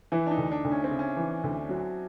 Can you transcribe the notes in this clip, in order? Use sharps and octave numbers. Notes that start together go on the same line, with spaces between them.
E3 E4
D4
D#4
D2
D4
D2
C#4
C4
C#3
C#4
E3
D2
F#3